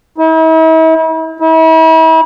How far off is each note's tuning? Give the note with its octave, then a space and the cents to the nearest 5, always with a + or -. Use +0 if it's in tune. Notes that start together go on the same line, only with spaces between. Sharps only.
E4 -45
E4 -40